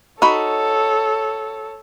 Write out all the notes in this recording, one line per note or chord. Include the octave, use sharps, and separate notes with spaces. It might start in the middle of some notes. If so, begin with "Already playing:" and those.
D#4 F#4 A4 C#5 B5